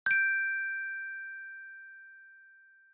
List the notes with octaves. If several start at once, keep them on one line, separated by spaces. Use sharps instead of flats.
G6 D7